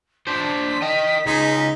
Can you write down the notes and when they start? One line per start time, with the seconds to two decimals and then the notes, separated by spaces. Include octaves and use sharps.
0.27 D4 C5 B6
0.82 D#5 G5
1.26 C#2 D#4 G#4